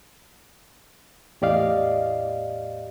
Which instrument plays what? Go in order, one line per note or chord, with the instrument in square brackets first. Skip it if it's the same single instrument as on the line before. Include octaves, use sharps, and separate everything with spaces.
[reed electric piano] E2 A2 G4 D5 D#5 F5